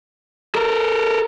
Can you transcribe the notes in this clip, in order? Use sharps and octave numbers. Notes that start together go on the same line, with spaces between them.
A4 A#4